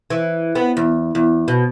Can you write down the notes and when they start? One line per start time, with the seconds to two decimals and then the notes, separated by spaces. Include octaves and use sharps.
0.10 E3
0.55 B3
0.77 E2
1.15 E2
1.48 B2